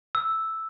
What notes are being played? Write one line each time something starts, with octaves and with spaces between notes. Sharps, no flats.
E6